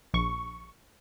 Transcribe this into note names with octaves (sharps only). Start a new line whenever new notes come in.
A#1 C#6